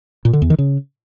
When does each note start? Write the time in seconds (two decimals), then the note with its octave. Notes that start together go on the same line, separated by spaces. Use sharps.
0.25 A#2
0.33 D3
0.42 E2
0.50 D#3
0.59 C#3